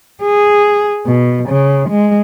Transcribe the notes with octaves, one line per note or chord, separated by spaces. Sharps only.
G#4
B2
C#3
G#3